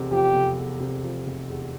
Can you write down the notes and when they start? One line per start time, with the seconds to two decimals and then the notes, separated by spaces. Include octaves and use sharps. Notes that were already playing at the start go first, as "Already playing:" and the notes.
Already playing: F1 E2 C3
0.11 F3 G4
0.34 F1
0.58 E2
0.80 C3
1.03 F3
1.26 F1
1.49 E2